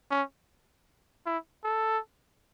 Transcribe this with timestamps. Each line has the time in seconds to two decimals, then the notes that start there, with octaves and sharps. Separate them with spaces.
0.11 C#4
1.26 E4
1.64 A4